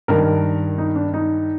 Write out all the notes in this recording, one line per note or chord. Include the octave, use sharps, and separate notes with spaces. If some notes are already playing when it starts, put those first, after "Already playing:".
G2 D#3 A#4
D#4
D4
D#4